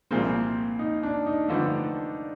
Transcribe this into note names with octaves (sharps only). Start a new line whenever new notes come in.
C2 A#2 F3 G#3 A#3 C4
D#4
D4
D#4
G2 D3 F3 A3